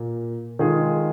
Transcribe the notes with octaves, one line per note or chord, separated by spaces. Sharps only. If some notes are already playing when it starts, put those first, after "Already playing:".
Already playing: A#2 A#3
D#3 G#3 F4 G#4